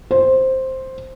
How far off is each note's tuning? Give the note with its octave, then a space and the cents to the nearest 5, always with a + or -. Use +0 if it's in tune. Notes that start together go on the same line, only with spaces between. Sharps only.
C5 +5